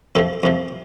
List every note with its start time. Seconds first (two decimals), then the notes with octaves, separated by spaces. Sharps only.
0.15 F2 C3 F3 A4
0.43 F2 C3 F3